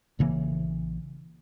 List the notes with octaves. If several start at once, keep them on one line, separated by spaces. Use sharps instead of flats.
A#1 C#3 E3 A#3